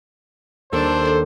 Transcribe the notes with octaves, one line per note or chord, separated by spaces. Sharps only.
D#2 D4 A4 C5